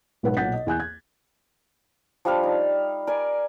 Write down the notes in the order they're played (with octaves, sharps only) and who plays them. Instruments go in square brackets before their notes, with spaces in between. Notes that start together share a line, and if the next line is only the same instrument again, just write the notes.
[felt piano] B1 G#2 B4 F#5
B1 A#2 F#5 G6 A6 B6
D#5
E2 G#5 F#6 G6
G#6
[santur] F3 G3 D4 F5
D#4
A#4 D5 G#5